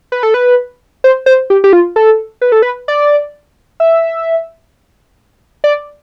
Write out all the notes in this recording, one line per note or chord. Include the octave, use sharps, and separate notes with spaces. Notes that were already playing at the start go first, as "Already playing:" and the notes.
B4
A4
B4
C5
C5
G4
G4
F4
A4
B4
A4
B4
D5
E5
D5